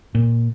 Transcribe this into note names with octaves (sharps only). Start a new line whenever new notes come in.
A#2